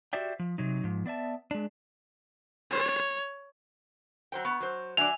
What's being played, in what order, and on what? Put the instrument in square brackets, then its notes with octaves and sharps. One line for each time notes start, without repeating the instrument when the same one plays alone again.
[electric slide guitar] F#4 G4 C5 D5 E5 G5
F3
C3 F#3 D#4
G#2 F3
B3 D5 E5 A5
G#3 D4
[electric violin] C#5
[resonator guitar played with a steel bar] F#3 C5 G5
[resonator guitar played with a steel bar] B3 [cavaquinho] C#6
[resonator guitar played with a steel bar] F#3 C5
[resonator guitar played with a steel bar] F#3 D4 D5 [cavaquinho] E5 G#5 [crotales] F7